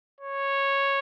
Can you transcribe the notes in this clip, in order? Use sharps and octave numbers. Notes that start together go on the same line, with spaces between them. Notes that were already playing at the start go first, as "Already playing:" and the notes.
C#5